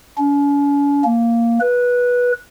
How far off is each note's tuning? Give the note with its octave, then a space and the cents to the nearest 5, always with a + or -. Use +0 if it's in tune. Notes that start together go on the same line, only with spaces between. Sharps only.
C#4 +45
A#3 -5
B4 -15